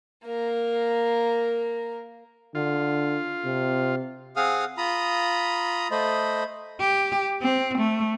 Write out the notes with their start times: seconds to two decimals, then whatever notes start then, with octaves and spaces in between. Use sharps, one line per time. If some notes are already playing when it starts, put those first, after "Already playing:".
0.25 A#3 A#4
2.55 D3 F4
3.45 C3
4.36 C4 G#4 F5 F#5 D#6 F6
4.77 F4 A#5 B5 D#6
5.91 A3 C5 D#5 B5
6.80 G4
7.42 C4
7.78 A3